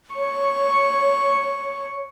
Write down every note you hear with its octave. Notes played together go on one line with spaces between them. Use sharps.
C#5 C#6